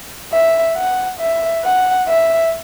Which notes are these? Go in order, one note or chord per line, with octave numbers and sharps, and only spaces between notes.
E5
F#5
E5
F#5
E5